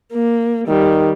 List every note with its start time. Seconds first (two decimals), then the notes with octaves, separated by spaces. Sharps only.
0.13 A#3
0.68 D#3 G3